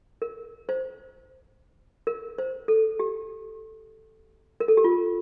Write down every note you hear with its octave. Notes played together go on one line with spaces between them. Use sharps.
A#4
C5
A#4
C5
A4
G4
A#4
A4
G4
F4